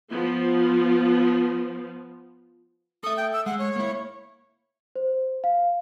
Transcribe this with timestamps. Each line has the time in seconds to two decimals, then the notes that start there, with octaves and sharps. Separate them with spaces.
0.10 F3 B3
3.04 A4 E5 D#6
3.17 G5
3.33 E6
3.46 G#3 F#5
3.59 C#5
3.76 A#3 E4
4.96 C5
5.44 F5